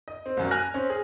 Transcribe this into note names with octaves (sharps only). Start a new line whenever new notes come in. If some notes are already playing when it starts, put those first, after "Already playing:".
D#5
C4
C2 F#2
G#5 F6 F#6 A#6
C4 C#4
G#4